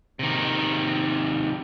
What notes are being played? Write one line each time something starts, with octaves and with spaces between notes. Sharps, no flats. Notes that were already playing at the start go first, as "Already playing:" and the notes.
C3 D#3